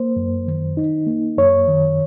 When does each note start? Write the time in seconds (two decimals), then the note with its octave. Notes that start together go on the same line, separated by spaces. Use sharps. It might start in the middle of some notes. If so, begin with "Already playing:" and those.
Already playing: A#3 C5
0.16 F#2
0.47 D#3
0.77 D#4
1.07 A#3
1.38 F#2 C#5
1.68 D#3